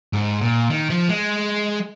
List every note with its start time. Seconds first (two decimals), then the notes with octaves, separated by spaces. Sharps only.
0.13 G#2
0.41 A#2
0.70 D#3
0.90 F3
1.09 G#3